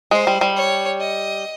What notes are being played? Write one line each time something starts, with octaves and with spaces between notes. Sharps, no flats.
G#3 C5
G3
G3
C#5
D#5